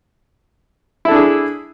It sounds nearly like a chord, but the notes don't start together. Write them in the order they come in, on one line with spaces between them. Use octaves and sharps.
E4 A4 D4 G#4